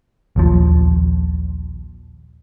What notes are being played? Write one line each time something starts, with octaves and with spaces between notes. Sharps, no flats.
A#1 D#2 F3